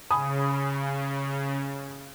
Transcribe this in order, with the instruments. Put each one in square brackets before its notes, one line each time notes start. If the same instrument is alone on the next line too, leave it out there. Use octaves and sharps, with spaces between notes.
[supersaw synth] C#3 [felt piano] G#5 B5 D#6